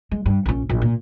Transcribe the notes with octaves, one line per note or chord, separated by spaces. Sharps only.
G#3
G2
A#1 C#4
A#1
A#2